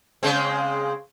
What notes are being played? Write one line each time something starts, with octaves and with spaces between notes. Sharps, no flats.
C#3 G#3 C4